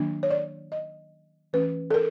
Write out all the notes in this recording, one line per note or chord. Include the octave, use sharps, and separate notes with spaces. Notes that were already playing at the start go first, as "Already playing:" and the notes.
Already playing: D#3 F#3 A#3 D4
C#5
D5
D#5
E3 A3 C#4 B4
A4
A#4